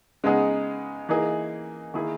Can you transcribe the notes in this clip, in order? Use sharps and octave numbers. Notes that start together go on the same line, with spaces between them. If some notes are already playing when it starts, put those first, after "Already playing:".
C#3 G#3 B3 D#4 G#4
E3 A#3 D#4 G#4
D#3 A#3 E4 G#4